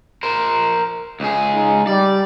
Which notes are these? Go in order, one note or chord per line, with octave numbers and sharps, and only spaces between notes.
A#4 C5
C#2 G#4
G#3 D#4
G3 D5